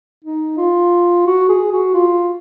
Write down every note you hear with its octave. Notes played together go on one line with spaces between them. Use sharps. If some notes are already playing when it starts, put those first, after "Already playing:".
D#4
F4
F#4
G#4
F#4
F4